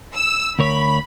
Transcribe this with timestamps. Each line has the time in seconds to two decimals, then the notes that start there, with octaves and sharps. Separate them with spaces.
0.15 E6
0.59 D2 A#4 C#5 B5